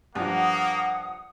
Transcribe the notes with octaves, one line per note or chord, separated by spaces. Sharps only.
G2 F3 A#3 F#5 D#6